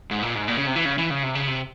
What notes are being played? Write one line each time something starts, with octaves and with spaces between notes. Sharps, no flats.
G#2
A#2
G#2
A#2
C#3
C3
E3
C#3
E3
C#3
C3
C#3
C3